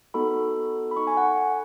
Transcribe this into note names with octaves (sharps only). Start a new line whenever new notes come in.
B3 D#4 F#4 A4 B5
B5
D#4 A4 C#6
G#5
F#5
G#5